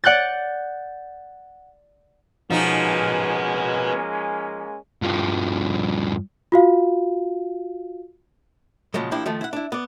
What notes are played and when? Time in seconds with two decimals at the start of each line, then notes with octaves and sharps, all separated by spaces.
0.04 D5 F#5 F#6 G6 A6
2.50 F3 G#3 A#3 B3 C#4 D#4 F#4
5.02 G2 F3
6.52 F4 F#4 F5
8.94 A#2 C#3 F3 F#3 G#3
9.11 F3 A#3 D4 E4 G4
9.26 D#3 F3 A3
9.41 E4 F#5
9.53 D4 E4
9.72 B3 D5